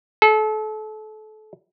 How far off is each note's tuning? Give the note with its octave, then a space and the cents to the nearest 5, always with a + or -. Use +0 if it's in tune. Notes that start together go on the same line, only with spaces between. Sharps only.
A4 -30